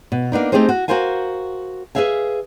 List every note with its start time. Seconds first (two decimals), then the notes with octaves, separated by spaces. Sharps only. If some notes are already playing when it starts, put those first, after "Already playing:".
0.12 B2
0.32 A#3 B3 D4 D#4
0.52 A3 C4 D#4 G4 G#4 C5
0.69 F#4
0.88 F#4 G4 A#4 C5 F5 G#5
1.95 G#4 A4 B4 E5 F5 G#5